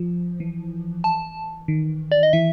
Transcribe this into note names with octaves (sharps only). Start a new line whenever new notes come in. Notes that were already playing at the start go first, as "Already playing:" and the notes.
Already playing: F3
E3
A5
D#3
D5
D#5
E3 E5